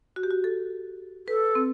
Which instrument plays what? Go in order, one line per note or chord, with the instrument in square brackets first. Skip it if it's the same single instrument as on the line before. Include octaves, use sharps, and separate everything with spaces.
[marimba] F#4
G4
F#4
A4
[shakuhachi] A4 [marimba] B4
[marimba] C4